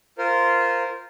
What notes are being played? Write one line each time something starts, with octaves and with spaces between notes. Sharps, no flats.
F4 A#4 C5